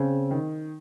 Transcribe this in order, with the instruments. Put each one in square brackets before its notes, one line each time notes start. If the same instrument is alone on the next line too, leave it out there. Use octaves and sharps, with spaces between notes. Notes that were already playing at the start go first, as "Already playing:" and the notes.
Already playing: [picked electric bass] C#3 [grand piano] C4
[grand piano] D#3